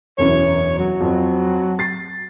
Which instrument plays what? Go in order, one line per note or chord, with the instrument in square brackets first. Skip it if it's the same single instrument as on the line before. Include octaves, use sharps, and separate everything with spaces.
[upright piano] E1 F#2 E3 [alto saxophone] C#5
[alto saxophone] F#3
[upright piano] F2 C4
A6 C7